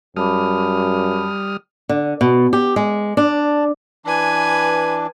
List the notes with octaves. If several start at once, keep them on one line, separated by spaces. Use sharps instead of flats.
F#2 G3 A5 B5 D6 D#6 F6
D3
B2
G4
G#3
D4
E3 D4 B4 G#5